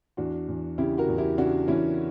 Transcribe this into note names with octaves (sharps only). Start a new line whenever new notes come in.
E2 D4 F#4
E2
C#3 E4 G4
F#4 A#4
E2
E4 G4
C#3 D4 F#4
E2 C#4 E4